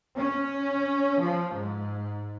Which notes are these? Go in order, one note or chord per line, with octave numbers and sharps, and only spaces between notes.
C#4
F3
G#2